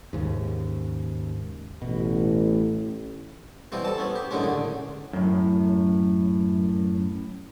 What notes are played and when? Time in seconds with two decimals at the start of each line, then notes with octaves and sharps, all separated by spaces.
0.13 D#2 G#2 C#3
1.82 A1 B2
3.72 B2 E3 G3 C4
3.85 A4 A5
3.98 B3 C#4
4.15 G4
4.31 F#2 A2 D3 G#3 C#4
4.43 D3
5.13 F#2 A2